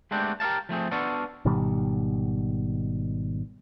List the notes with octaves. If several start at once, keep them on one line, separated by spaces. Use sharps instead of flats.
G#3 A3 B3 C4 D4 G4
G4 A#4 D#5 F5 A5
F3 A3 C4 G#4
B3 D4 F4 F#4 A4
G#1 B2 D#3 G3